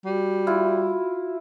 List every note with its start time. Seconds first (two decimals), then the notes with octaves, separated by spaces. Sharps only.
0.05 G3 F#4
0.47 E4 F4